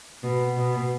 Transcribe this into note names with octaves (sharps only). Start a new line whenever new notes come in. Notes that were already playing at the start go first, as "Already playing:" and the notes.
B2
B2